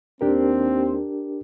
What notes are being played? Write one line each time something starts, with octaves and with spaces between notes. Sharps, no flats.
D#2 C4 D4 G4 A#4